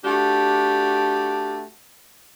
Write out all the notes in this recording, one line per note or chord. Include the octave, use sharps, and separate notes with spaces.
A3 D4 F#4 G4